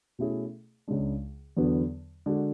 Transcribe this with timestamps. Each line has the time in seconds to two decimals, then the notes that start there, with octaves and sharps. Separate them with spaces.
0.18 B2 A3 C#4 E4 G#4
0.88 C#2 C#3 G#3 D4
1.57 E2 D3 F#3 B3
2.26 D3 G#3 D4 F#4